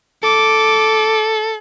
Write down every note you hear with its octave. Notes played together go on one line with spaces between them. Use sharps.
A4 D6